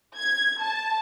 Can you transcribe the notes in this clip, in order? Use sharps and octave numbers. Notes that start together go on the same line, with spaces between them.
G#6
A5